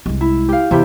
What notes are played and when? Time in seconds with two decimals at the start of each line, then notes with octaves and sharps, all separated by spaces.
0.06 C2 G#3
0.21 E4
0.48 G4 F5
0.71 E2 C3 E4 G4